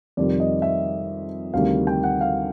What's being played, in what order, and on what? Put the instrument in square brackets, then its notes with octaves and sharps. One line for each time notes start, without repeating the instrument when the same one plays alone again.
[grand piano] F2 C3 D#3 G3 D5
D#5
E5
D2 C3 D#3 G3 F5
G5
F#5
F5